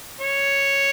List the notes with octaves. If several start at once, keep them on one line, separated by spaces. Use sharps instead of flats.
C#5